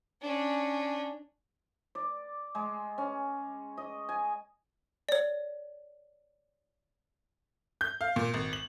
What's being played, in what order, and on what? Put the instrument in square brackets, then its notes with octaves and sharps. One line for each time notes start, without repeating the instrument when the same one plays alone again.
[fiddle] C#4 D4
[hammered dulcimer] D5
G#3
C#4
D#5
G#5
[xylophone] C#5 D5
[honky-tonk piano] G6
F5
A#2
G#1
F#7